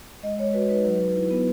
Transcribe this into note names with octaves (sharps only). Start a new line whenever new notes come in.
G#3 D#5
G#3 C#5
F#4 B4
D#4 B4
F#3 B4
F#3
E4
B3